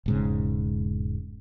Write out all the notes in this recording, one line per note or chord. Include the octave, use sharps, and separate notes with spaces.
E1 G#2 C#3